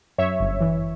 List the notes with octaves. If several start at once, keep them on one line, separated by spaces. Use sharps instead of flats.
F#2 C#5 E5
G1
E3